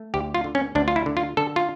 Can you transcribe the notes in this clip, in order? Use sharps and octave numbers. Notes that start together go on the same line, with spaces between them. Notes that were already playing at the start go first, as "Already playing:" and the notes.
Already playing: A3
D2 G4
F4
D3
C#4
D2 D4
F4
E4
D3
F4
D3 A4
F4